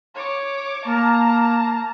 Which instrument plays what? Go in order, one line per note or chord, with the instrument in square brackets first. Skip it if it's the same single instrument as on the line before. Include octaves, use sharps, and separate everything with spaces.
[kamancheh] C#5 D6
[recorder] A#3 [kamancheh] A5 A#5